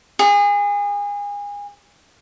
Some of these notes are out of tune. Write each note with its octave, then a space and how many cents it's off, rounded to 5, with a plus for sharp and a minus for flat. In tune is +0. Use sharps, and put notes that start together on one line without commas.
G#4 -30